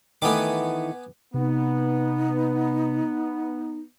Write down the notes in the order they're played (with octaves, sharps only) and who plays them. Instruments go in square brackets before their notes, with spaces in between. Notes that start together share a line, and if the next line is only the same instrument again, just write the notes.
[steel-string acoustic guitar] D#3 E3 A3 [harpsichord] B3 G#5 D6
[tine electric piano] C3 [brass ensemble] B3 [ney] D#4